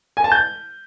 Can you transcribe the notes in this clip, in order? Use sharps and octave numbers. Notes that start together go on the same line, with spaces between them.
G#5
A5
G6